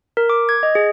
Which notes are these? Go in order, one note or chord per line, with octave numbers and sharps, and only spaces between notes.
A#4
D6
G#6
D#5
G#4